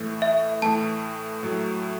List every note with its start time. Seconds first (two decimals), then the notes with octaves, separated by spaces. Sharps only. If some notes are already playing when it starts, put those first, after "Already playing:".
Already playing: A2 E3 A3
0.22 E5
0.62 A2 E3 A3 A5
1.43 A2 F#3 A3